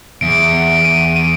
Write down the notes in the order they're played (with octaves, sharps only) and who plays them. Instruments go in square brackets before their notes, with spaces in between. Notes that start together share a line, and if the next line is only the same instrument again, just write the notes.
[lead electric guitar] E2 [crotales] D7
[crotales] D#7
D#7